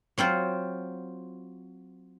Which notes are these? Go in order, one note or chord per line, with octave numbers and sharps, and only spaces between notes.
F#3 C4 F4 C5